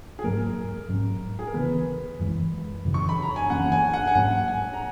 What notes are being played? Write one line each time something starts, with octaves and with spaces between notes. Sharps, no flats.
G#4
G#2 F#3 A#3 A#4
G#2 F#3 C#4
G#4
A#4
C#3 E3 B3 B4
F#2 E3 G#3
F#2 C#3 E3
C#6
B5
A#5
G#5
F#2 E3 A#3 C#4 F#5
G#5
F#5
G#5
G#2 F#3 A#3 C#4 F#5
G#5
A#5